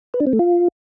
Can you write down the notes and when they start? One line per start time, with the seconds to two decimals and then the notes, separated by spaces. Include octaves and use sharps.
0.14 B4
0.20 D4
0.27 C4
0.33 A3
0.39 F4